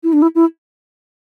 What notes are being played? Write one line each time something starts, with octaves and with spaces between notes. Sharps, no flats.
E4
D4
E4
E4